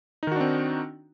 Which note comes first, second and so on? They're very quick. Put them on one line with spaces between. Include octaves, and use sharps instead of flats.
D#4 D#3 F#4 D4 C4